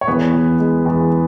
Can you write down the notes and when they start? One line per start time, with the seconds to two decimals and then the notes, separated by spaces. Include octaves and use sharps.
0.01 C#5
0.08 E2 B3 B4
0.33 E2
0.60 G#3
0.86 E2